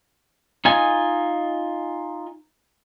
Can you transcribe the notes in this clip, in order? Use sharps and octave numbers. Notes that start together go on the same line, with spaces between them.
D#4 F4 G#5